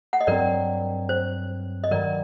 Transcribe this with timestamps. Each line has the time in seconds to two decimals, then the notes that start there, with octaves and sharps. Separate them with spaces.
0.13 F#5
0.21 D#5
0.27 G2 F#3 C4 A#4 D5
1.09 C5
1.84 D#5
1.91 G2 D#3 F#3 A#4 D5